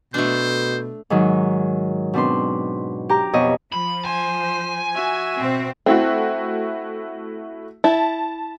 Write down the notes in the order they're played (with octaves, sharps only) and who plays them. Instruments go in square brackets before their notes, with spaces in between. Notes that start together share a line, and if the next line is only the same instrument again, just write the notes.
[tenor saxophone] B2 [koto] A3 D4 [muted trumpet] C5
[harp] G#2 D#3 F#3
B2 C4 D4 B4 C6
G4 A#5
F2 B2 C#5 D#5
[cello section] F3 [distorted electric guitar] B5
[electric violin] C5 [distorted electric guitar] G#5
[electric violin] F#4 E5
[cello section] B2 C4
[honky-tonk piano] A3 E4 F#4 [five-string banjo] C4
[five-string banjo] E4 [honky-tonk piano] A5